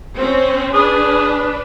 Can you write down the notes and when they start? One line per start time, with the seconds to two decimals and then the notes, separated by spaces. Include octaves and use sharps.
0.18 C4 C#4
0.74 D4 G#4 B4